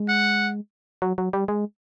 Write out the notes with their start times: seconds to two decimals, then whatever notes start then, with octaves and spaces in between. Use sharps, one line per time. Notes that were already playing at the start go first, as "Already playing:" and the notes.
Already playing: G#3
0.09 F#5
1.02 F#3
1.18 F#3
1.33 G3
1.48 G#3